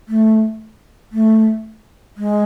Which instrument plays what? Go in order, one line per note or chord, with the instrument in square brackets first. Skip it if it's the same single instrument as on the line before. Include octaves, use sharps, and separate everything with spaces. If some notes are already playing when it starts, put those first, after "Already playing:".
[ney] A3
A3
G#3